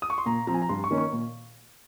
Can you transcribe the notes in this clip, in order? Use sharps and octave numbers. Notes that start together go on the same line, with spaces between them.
D#6
C#6
C6
A#2 A#5
F3 C4 A#5
G#5
A#5
G2 C6
C#6
D#3 A#3 C#4
C#6
A#2